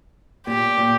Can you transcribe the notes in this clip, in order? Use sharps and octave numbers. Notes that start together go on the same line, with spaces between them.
A#2 G4
A#2